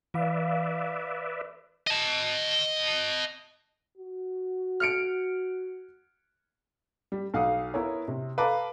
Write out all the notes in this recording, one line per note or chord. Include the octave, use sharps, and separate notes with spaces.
E3 B4 D5 E5 F5
D#5 A5
F#4
F6 C#7 D7
G3
B1 F5 F#5 D#6
B3 E4 A#4 C#5
C3
A4 B4 F5 A5 A#5 D6